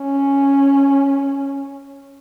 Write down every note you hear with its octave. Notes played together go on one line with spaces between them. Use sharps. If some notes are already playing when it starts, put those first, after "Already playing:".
Already playing: C#4